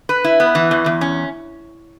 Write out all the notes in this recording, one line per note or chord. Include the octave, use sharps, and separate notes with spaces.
B4
E4
B3
E3
E2
E2
C#4